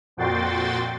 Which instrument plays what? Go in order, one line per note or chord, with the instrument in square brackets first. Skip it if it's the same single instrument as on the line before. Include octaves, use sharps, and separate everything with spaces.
[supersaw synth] F2 A#2 F#4 G5 C6 A6